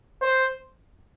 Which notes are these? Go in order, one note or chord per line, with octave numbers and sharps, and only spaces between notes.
C5